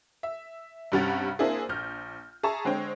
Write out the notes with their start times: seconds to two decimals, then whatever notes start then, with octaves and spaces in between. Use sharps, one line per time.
0.23 E5
0.92 G2 C3 G3 C#4 F#5 A6
1.39 A#3 C4 D4 E4 G#4
1.69 A#1 F6 G6
2.43 G#4 E5 A5 A#5 C#6
2.65 D3 G#3 C4 C#5 G5